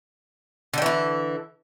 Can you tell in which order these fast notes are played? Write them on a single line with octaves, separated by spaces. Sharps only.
D3 G3 E3 E4